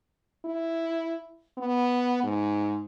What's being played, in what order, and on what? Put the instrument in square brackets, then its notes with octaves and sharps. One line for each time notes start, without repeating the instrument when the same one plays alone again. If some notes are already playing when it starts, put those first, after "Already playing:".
[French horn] E4
B3
G#2